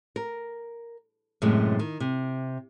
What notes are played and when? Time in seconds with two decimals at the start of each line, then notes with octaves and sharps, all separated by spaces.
0.16 A#4
1.42 F#2 A2 C3 E3 G#3
1.79 D#3
2.00 C3